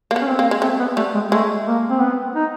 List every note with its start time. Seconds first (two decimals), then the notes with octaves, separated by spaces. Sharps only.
0.11 A#3
0.16 B3
0.21 C#4
0.27 C4
0.39 A#3
0.51 G#3
0.62 A3 C4
0.80 B3
0.97 G3 A3
1.14 G#3
1.32 G#3 A3
1.67 A#3
1.90 C4
2.02 B3
2.35 D#4